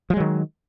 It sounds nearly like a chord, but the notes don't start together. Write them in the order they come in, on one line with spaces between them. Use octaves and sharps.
F3 G#3 F#3 D#3